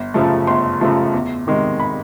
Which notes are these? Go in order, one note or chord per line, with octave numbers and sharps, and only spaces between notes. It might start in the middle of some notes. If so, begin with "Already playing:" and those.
Already playing: G1
F#2 C#3 F3 A3
G1 C6
F#2 C#3 F3 A3
E2
C3 D#3 G#3
B5